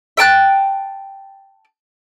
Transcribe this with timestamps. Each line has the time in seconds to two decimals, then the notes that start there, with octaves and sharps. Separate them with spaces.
0.17 E5 G5 A5 F#6